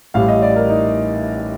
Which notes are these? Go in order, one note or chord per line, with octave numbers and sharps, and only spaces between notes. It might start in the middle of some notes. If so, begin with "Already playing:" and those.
A1 A2 G3 F5
D#5
D5
A#4
D#4